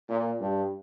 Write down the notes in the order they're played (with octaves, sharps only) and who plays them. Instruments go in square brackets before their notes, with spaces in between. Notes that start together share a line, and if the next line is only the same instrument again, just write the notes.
[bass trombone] A#2
G2